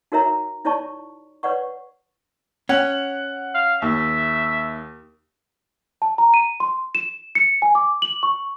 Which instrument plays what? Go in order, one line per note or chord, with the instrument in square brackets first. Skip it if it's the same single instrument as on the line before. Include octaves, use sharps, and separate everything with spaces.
[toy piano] D#4 F#4 A#4 C#5 E5 A#5
D#4 E4 C#5 D5 A5 C#6
B4 C#5 D5 F#5 C#6
[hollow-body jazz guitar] C#4 [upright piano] F#5
[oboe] F5
[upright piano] D#2 [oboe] E5
[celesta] A5
A#5
D#7
C6
E7
C#7
G#5
D6
F#7
C#6